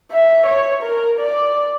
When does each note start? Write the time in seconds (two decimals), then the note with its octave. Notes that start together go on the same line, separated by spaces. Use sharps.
0.12 E5
0.46 C#5
0.83 A#4
1.19 D5